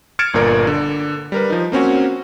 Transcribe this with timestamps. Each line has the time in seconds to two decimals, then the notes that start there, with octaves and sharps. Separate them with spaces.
0.19 F6 G#6 A6 C#7 D7 E7
0.34 G1 A#2 A#4 D5
0.67 D3
1.32 G3 A#4 B4
1.50 F3 D#4
1.72 A#3 C4 C#4 F#4